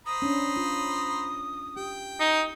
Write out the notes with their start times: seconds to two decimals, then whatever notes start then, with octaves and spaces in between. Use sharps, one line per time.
0.06 C5 A#5 B5 D#6
0.22 C#4 D4
0.56 F4
1.77 G4 G5
2.20 D#4